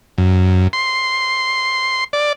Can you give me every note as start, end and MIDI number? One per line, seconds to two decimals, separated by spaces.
0.18 0.68 42
0.73 2.04 84
2.13 2.33 74